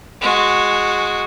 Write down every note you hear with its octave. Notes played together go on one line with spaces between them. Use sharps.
G#3 F#4